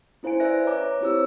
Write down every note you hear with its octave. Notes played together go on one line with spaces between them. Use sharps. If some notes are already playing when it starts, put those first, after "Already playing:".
C#4 E4 C5 F5 G#5 D7
B4 D5 E5 F#6 A#6
C#5 A#5 D6
C4 E4 G4 C5 E6